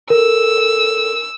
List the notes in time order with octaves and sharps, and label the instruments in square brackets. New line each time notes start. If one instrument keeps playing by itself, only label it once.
[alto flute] A4 [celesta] A#4 [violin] E6